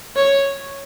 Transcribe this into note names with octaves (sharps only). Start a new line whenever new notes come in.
C#5